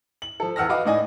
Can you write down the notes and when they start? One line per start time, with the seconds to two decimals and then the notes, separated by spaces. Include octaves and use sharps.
0.22 F#7
0.40 F3 A4
0.56 E2 F#5 E6 F6 A#6
0.69 F#4 B4 D#5 F5 D6
0.85 A2 D#4 D5 D#5 G#5